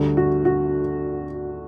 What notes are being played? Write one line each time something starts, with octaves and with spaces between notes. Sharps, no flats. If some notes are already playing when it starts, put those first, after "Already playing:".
Already playing: D2 D3 G3
F#4
F#4